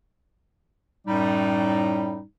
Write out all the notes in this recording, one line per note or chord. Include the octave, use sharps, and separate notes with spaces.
F#2 A2 G3 D#4